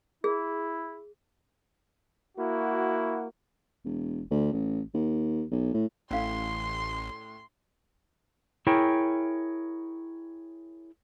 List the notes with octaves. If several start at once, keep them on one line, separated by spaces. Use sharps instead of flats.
E4 G#4
A#3 E4 F#4
E1
D2
A1
D#2
B1
A2
A1 A2 C#4 E4 F5 C6
E4 G#4 A#4 C#5 G5